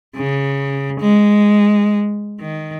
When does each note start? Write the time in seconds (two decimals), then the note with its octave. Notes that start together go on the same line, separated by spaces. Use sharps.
0.16 C#3
1.00 G#3
2.40 D#3